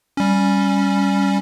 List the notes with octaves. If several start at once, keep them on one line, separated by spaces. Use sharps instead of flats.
G3 C#4